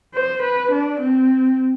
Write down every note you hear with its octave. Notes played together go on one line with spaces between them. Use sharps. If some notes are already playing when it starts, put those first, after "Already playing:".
C5
B4
D4
C4